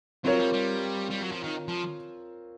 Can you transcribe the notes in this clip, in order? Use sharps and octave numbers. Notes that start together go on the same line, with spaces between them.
F#3 C4 F4 A#4 C#5
G3
G3
G3
F#3
F3
D#3
F3